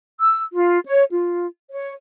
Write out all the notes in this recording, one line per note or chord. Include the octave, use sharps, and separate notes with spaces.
E6
F4
C#5
F4
C#5